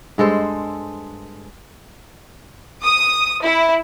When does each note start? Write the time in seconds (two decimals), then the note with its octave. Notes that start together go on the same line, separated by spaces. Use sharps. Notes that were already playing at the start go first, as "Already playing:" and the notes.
0.18 G2 G#3 A4 C5
2.83 D#6
3.43 E4